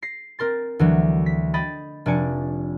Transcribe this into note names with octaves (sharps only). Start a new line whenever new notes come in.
A#6 C7
C4 A#4 C6 A6
D2 E3 F#3
B6
D#5 G5 B5 A6
F1 D4 D5 G#5 C#7